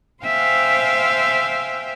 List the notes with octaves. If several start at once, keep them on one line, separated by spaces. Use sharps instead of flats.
C5 E5 F5 G5 G#5